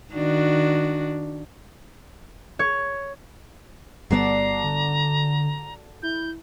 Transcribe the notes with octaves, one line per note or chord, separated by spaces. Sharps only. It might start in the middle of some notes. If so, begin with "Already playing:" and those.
D#3 D4 F#4
C#5
G1 G3 B3 F#4 A4 D5 A#5 C7
D3
E4 G6